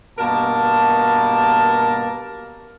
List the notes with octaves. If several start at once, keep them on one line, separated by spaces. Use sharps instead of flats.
G2 B2 A#3 A#4 A5